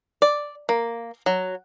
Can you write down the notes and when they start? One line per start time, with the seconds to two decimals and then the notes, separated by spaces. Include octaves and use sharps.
0.22 D5
0.69 A#3
1.26 F#3